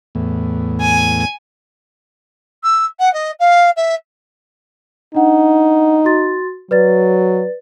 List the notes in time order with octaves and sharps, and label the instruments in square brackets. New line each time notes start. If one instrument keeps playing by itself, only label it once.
[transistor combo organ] E2 A2
[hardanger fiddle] G#5
[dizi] E6
F#5
D#5
F5
E5
[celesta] D4 F#5 [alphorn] D#4
[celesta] F#4 C6 A6
[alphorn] F#3 [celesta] B4 D5 A6